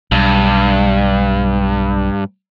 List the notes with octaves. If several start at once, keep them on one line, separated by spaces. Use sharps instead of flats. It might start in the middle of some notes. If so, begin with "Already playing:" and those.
B1 G2